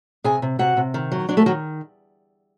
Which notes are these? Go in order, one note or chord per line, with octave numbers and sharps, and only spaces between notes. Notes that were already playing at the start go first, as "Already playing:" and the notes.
C3 G#4 G#5
C3
C3 F#4 F#5
C3
D#3
F#3
F#3 D4 D5
A3 A4
D#3 F#3 F#4